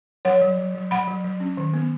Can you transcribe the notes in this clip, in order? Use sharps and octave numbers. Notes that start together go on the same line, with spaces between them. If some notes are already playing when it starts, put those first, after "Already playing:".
F#3 C#5 F#5
F#3
F#3
F#3
F#3 F#5 B5
F#3
F#3
C#4
D#3
B3